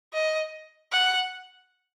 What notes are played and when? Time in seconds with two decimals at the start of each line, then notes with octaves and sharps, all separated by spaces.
0.14 D#5
0.92 F#5